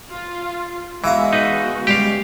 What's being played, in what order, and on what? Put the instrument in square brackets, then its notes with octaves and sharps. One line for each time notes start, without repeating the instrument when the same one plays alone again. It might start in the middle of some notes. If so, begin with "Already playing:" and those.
[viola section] F4
[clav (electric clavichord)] E3 [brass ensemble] G#3 [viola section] B3 F#4 [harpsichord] E5 F5 A#5
[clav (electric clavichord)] D#4 B4
[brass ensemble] C#2 [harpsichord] G3 G#3 [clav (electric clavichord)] G4 F5